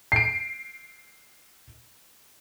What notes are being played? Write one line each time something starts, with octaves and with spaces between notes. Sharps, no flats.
C7 D7